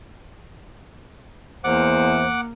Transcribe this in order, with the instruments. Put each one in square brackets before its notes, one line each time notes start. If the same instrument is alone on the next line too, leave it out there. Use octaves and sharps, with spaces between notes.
[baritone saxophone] E2 [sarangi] A#3 [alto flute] C5 [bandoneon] F#5 D6